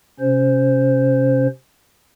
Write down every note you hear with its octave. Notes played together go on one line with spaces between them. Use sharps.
C3 C#4 C5